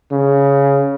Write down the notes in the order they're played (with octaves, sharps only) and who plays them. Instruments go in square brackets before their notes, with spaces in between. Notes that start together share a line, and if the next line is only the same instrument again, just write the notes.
[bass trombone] C#3